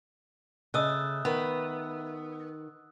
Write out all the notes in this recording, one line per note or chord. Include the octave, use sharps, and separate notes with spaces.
C#3 A3 D#5 D#6 E6 F#6
D#3 B3